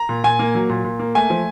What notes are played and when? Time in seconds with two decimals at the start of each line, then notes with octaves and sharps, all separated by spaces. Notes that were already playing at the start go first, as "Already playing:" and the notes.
Already playing: A#5
0.09 A#2
0.24 A#2 G#5
0.39 A#3
0.55 F#3
0.69 A#2
0.84 A#2
0.99 A#3
1.15 A3 G#5
1.30 F3